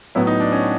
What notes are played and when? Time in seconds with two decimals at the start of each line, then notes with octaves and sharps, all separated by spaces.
0.15 A2 F#3 B3 E4
0.27 D#4
0.40 D4
0.52 C#4